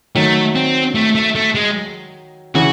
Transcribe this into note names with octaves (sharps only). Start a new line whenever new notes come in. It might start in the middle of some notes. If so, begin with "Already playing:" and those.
D#3 F#3 A3
C4
A3
A3
A3
G#3
C#3 E3 F#4